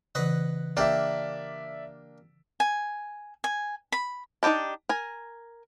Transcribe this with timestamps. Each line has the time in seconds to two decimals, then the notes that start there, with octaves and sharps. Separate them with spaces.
0.15 C#3 E3 B4 D#5 F#5
0.77 A#3 D4 G4 D5 E5
2.60 G#5
3.44 G#5
3.92 B5
4.43 D4 D#4 F#4 G4 A5
4.89 A#4 G#5